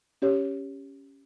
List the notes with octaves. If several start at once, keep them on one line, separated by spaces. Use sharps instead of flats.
C#4 G4 C#5